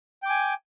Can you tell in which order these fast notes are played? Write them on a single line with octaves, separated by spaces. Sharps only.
G5 D6 G#5